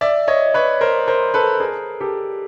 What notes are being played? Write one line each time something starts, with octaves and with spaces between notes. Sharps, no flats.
D5 E5
C#5 D#5
B4 C#5
A#4 C5
A#4 C5
A4 B4
G#4 A#4
G4 A4